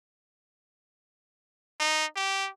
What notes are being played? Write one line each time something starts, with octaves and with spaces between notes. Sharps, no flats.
D#4
G4